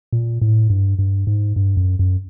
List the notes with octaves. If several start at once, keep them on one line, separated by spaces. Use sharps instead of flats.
A#2
A2
G2
G2
G#2
G2
F#2
F#2